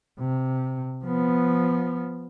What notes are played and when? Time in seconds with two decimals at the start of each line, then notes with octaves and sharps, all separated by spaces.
0.20 C3
1.04 F3 B3